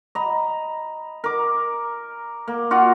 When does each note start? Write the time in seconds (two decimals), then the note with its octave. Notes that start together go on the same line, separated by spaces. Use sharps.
0.15 D#5 A#5 B5
1.24 A#4 D6
2.48 A#3
2.71 F4 F#4 F5 F#5